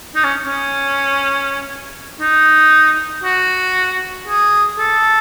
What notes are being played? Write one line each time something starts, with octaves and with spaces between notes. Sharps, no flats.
D#4
C#4
C#4
D#4
F#4
G#4
A4